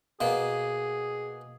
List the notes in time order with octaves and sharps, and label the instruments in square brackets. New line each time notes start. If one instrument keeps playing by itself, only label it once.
[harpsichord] B2 A#3 [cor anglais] G#4